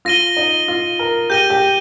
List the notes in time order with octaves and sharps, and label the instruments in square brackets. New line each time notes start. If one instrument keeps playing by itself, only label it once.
[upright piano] F4 [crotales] A#6 D#7 G7
[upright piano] D#4
F4
A#4
[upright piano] G4 [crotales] G6 A#6 D#7 G7
[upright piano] G4